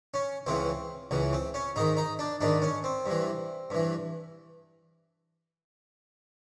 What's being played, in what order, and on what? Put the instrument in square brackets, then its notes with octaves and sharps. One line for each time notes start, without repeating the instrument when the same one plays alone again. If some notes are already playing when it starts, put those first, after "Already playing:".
[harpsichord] C#4
C#2 C#3 E3 C4
C#2 C#3 E3
C4
C#4
G#2 D#3 D#4
D#4
D4
G#2 D#3 D4
C#4
C4
G2 E3
G2 E3